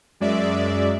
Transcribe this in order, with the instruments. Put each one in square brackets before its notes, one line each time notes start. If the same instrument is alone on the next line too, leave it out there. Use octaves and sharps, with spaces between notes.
[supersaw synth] F#2 G#3 D5 E5